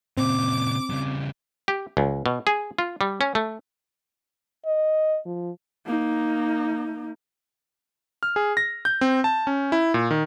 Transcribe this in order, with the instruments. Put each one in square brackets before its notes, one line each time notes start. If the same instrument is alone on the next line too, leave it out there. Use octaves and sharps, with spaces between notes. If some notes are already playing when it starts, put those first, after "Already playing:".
[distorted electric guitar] A#2 C#3 [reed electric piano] C4 [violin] D6
[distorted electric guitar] C#3 G3
[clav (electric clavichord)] G4
C#2
B2
G#4
F4
G3
C#4
A3
[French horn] D#5
F3
[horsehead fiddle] A#3 D#4
[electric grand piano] F6
G#4
A#6
G6
C4
A5
C#4
E4
A#2
D#3